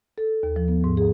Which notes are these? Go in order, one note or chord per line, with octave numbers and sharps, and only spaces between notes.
A4
D#2
F3
B3
G#2
G#4